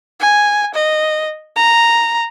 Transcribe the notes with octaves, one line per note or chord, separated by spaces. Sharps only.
G#5
D#5
A#5